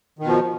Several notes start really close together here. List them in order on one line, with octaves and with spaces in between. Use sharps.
D#3 B2 F3